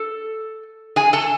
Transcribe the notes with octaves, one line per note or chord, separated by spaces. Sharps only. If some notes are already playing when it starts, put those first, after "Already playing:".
Already playing: A4
G#4 G#5
A4 A5